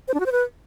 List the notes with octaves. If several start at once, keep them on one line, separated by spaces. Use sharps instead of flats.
C5
D4
F#4
C5
B4